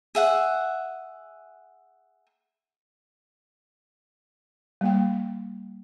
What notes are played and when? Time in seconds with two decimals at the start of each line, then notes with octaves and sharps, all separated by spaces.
0.15 G#4 E5 F#5
4.81 G3 A#3 G5